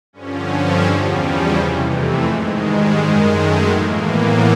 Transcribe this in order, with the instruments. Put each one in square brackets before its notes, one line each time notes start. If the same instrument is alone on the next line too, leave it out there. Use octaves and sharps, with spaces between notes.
[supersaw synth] G2 D3 F3 C#4
C4
E2 C#3 F3 G3
C#4
F2 C3 E3
A3
G#2 D#3 G#3
G3
F#2 D#3 G#3
A3
A2 E3 A#3
B3